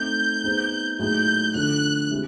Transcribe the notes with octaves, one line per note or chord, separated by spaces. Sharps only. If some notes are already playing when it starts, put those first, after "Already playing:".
Already playing: A3 C4 D#4 G6
B3 D#4 G#4 C5
A2 F#3 A#3 D#4 G#4 G6
D3 F3 A3 D4 F#6
G#3 C4 E4 G4